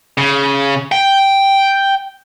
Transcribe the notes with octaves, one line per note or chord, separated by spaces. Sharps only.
C#3
G5